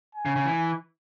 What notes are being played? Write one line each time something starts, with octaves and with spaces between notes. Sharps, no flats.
G#5
C#3
C#3
E3